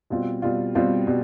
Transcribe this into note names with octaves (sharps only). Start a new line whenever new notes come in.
B2 G3 C4 F4
B2 G3 C4 F4
B2 G3 C4 F4
B2 G3